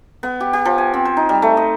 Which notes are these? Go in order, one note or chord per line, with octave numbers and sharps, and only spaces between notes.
B3
G4
G4
F3
G#5
C4
C5
D#4
G3
A3
D#5